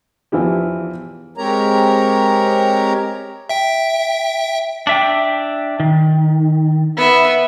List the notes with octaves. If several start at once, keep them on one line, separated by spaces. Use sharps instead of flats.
E2 E3 F3 E4 G4
G#3 C4 G4 A#4 C#5 A#5
E5 G5
D4 E5 G5
D#3
B3 E5